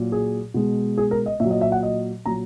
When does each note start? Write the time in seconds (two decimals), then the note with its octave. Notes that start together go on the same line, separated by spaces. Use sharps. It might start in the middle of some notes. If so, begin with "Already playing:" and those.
Already playing: A#2 F#3
0.12 G#4
0.54 B2 G#3
0.98 G#4
1.11 A#4
1.26 D#5
1.40 A#2 F#3 E5
1.51 D#5
1.61 E5
1.72 F#5
1.83 D#5
2.26 A#2 F#3 A#5